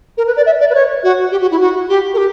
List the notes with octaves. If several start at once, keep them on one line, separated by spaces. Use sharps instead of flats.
A#4
B4
D5
E5
D5
B4
C#5
F#4
G4
F#4
E4
F#4
G4
A#4
G4